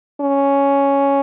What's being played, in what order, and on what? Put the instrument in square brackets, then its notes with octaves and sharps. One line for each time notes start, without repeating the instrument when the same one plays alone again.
[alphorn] C#4